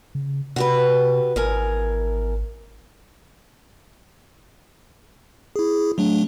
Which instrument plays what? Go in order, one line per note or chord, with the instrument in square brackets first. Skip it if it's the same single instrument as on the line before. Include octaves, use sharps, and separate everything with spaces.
[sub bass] C#3
[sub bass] C3 [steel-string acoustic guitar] F#4 G4 B4
[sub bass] G#1 [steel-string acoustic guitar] E2 A#4 G#5
[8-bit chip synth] E4 G#4
F#3 A3 D4